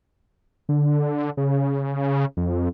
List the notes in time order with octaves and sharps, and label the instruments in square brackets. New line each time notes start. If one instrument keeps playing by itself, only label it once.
[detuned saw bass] D3
C#3
F2